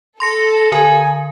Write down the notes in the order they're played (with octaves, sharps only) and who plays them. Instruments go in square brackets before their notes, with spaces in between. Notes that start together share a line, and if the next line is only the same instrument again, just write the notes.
[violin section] A4 [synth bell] C6 A#6 C#7
[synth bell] D3 A#4 [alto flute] G#5